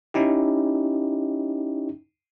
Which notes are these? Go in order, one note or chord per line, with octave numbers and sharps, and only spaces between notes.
C#4 D#4 E4 G4